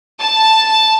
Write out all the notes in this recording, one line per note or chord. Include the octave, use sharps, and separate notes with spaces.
A5